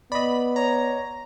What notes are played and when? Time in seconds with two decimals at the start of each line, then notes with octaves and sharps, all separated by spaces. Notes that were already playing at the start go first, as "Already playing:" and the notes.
0.12 B3 D5 D#5 B5
0.56 C#5 A#5